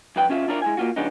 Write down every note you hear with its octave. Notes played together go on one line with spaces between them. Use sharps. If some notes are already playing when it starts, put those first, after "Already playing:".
C2 F2 B4 G5
C3 C#4 F4 E5 F5
D4 E4 F4 A#4 C5 D5
G#3 E4 G#5
A#3 F4 F#4
C#3 F3 G#3 B3 D4 D#4